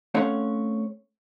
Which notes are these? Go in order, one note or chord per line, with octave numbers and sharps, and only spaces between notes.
A3 C4 C#4 C#5 F5 F#5